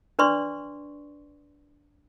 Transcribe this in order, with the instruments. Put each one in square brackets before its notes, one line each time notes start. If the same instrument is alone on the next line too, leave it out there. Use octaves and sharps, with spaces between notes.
[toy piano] D4 B4 D5 C6 C#6